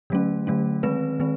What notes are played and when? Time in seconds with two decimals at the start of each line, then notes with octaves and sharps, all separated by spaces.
0.10 D3 F#3 A3 C#4
0.47 D3 F#3 A3 C#4
0.83 D#3 G#3 C4 B4
1.20 D#3 G#3 C4